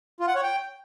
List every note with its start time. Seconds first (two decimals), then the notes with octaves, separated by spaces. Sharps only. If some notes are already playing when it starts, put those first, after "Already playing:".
0.20 F4
0.28 F#5
0.36 C#5
0.43 G5